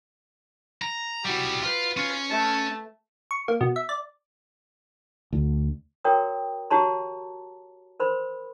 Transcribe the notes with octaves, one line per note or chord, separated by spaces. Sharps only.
A#5
G3 E4 F#4 G4
F4 B4
C#4 F4
A3 A5
C#6
A#3
B2
E5
D5
D2
F#4 A#4 C#5 G5 A#5 D#6
F#4 G4 C#5 A5 A#5 C6
A#4 C5 B5 C6